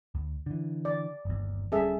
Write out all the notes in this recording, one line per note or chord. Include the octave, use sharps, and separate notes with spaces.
D2
D3 E3
D5
G1 D#2
D1 G3 C#4 G#4 A4 E5